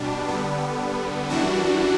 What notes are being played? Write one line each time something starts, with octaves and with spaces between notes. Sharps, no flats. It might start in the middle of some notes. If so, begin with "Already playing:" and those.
Already playing: B2 G3 D4
D3 G3 B3
F#2 E3 G3 D4 F#4